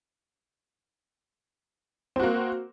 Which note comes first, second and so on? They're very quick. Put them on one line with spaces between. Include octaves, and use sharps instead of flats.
C4 F#4 A#3